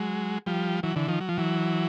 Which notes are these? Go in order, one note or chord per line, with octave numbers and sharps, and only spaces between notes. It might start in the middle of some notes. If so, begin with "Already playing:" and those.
Already playing: F#3 G#3
F3 G3
E3 F#3
D3 E3
D#3 F3
F#3
F3
E3 F#3